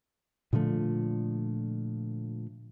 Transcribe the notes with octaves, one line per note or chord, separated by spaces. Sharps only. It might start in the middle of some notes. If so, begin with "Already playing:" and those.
A#2 D3 F3 A3